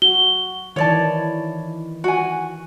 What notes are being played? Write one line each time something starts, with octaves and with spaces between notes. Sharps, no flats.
F#4 G7
D#3 E3 C#5 D5 A5
F#4 G#5